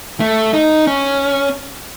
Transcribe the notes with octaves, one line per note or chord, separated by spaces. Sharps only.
A3
D#4
C#4